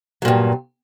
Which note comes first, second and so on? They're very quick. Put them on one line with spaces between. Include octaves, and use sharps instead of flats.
F#3 A#2 G2